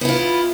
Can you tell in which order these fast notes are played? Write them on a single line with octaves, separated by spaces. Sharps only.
B3 E4 F4